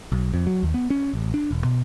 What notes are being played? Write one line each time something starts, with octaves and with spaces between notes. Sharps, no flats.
B1
F2
F#3
D#2
B3
C#4
A1
D4
E1
B2